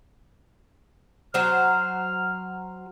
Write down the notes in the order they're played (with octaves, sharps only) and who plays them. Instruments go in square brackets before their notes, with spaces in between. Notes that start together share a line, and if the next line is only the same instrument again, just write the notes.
[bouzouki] F#3 C5 [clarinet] F6